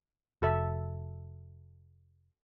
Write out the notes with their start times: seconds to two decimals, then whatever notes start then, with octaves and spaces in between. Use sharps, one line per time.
0.42 F1 F#4 A4 E5